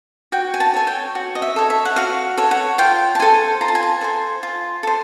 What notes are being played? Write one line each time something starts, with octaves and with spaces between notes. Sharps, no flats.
F#4 G5
G#5
A5
A4 C#5 G#5
G5
F#4
D#5
E5
A4 C#5
E5
F#5
F#4 F5
A4 C#5
F#5
F4 G5
A5
A4 C5 G#5
F4 A#5
A5
G#5
A5
A4 C5 G#5
F4
A4 C5